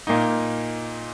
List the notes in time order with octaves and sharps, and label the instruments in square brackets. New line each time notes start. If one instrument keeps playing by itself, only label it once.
[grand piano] A#2 A#3 D#4